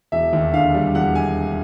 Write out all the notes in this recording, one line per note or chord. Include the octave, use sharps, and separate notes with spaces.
E1 E5
D#2
D3 F5
G3
E1 F#5
G#5